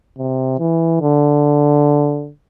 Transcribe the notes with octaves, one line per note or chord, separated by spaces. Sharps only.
C3
E3
D3